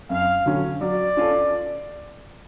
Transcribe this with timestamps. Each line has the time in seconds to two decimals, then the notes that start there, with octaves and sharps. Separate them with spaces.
0.10 F#2 F5
0.46 D3 F#3 C#4
0.81 F#3 D5
1.17 C#4 F4 A4